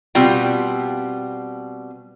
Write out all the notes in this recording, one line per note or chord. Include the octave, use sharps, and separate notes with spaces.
B2 G3 C4 F4 G5